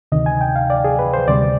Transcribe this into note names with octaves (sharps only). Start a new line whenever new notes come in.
D2 C3 D#3 D#5
G#5
G5
F5
D5
G#4
B4
C5
D2 C3 G3 D5